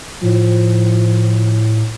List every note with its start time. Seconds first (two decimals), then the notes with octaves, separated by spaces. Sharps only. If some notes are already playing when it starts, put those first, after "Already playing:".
0.23 A2 F3